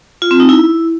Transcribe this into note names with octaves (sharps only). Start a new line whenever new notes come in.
F4
C4
D#4
E4